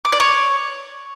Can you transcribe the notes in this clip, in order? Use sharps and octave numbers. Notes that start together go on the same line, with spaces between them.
D6
D5
C#5